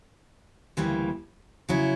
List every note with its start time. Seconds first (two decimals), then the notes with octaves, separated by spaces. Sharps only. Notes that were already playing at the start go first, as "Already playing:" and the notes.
0.77 D2 C#3 E3 G3 A#3
1.69 C#3 F#3 C#4 E4